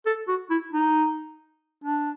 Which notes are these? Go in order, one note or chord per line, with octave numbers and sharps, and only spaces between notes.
A4
F#4
E4
D#4
D4